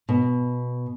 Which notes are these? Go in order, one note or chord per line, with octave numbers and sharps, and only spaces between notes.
B2